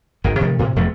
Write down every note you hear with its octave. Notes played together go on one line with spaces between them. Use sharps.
G#1 D#3
C3 D#3 F3 A3
A2 C3
E1 F2 F3 A3